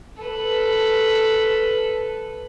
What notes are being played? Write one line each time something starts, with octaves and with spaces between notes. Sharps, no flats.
A4 B4